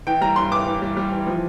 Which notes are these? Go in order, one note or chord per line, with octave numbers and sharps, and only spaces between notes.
E3 G5
G3 A#5
G2 C6
E3 D6
E3
G3
G3
E3
F3